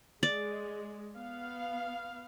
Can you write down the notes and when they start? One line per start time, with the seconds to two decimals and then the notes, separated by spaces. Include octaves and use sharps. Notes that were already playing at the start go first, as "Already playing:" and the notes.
0.23 G#3 D5
1.17 B3 F5